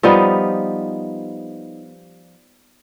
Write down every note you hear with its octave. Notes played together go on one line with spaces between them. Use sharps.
F3 G3 B3 D#4